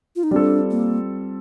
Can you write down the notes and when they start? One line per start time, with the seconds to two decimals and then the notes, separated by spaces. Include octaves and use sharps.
0.16 F4
0.23 D#4
0.31 G3 C4 D4 F4 A4
0.71 A#3